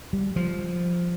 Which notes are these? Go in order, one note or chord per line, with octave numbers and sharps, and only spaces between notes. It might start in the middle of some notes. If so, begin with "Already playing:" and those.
G3
F3